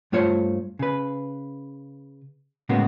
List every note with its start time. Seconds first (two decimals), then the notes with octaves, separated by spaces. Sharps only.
0.12 G2 A3 F4 C5 C#5
0.79 C#3 B4
2.69 A2 C#3 G#3 A#3 B3 F#4